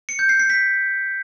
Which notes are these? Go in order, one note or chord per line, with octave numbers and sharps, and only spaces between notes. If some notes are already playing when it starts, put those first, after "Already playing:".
C#7
G6
C7
C7
B6